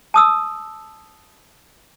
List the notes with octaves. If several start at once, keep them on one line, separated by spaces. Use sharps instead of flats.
A5 D#6 E6